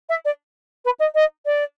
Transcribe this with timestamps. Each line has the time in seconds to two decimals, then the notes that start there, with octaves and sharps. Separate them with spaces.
0.09 E5
0.25 D5
0.85 B4
0.99 D#5
1.15 D#5
1.46 D5